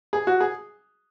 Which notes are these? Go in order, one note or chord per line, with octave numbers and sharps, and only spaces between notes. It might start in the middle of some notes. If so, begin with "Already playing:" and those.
G#4
F#4
G#4